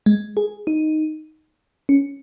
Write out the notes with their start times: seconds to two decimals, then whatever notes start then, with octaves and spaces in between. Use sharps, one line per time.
0.06 G#3
0.37 G#4
0.67 D#4
1.89 C#4